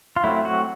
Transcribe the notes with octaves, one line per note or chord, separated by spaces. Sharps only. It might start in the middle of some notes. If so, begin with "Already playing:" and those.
F4
F#3 A3 C4 E4
F#4